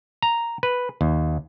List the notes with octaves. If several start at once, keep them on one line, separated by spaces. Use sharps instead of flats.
A#5
B4
D#2